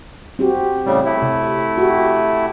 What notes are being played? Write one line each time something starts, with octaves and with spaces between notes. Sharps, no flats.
C4 F#4 G4
A2 C#3 G3
A3 E4
C3
F#4 G4